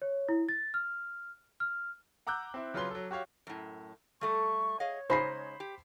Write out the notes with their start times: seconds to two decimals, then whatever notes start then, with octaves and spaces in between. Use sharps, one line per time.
0.02 C#5
0.29 E4
0.49 A6
0.74 F6
1.60 F6
2.27 F#5 A#5 D6 E6 F#6 G6
2.54 C4 E4
2.74 C#3 F#3 F4 B4 C6 G7
2.91 F#3 A4
3.11 F#4 G4 C#5 F5
3.47 F#2 A2
4.21 G3 A3 A4 C#6
4.80 G#4 C#5 D#5 F5
5.10 C#3 G#3 D#4 C5 B5 C7
5.60 G4